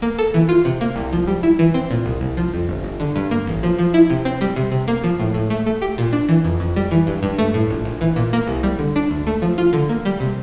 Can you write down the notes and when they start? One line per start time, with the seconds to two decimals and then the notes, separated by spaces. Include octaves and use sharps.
0.02 A#3
0.19 A4
0.34 E3
0.49 F4
0.65 C3
0.81 A#3
0.96 C2
1.13 F3
1.27 G3
1.43 E4
1.59 E3
1.74 C4
1.91 A#2
2.06 C2
2.21 C2
2.37 F3
2.54 F2
2.69 G1
2.84 G1
3.00 D3
3.16 G2
3.31 A#3
3.47 A1
3.63 F3
3.79 F3
3.94 E4
4.10 C3
4.25 C4
4.41 G3
4.56 C3
4.72 C3
4.88 A#3
5.04 F3
5.19 A2
5.34 A2
5.50 A3
5.66 A3
5.82 G4
5.98 A#2
6.13 D4
6.29 E3
6.45 F2
6.60 F2
6.76 G3
6.91 E3
7.07 G2
7.23 G2
7.38 A3
7.54 A2
7.70 A#1
7.85 A#1
8.01 E3
8.16 A#2
8.33 A#3
8.48 C2
8.63 G3
8.79 D3
8.96 D4
9.11 D2
9.27 A3
9.42 F3
9.58 F4
9.73 D3
9.89 A#3
10.05 G3
10.20 C3